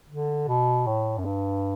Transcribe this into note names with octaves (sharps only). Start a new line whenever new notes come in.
D3
B2
A2
F#2
G2